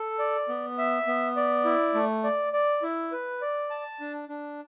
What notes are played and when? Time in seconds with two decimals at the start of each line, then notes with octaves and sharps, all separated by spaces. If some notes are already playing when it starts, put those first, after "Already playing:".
Already playing: A4
0.19 D5
0.49 B3
0.78 E5
1.07 B3
1.37 D5
1.65 E4
1.95 A3
2.24 D5
2.53 D5
2.82 E4
3.12 B4
3.42 D5
3.70 A5
4.00 D4
4.29 D4